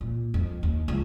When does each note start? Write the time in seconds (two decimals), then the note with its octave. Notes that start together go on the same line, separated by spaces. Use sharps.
0.01 A#2
0.34 F2
0.63 D#2
0.88 C#2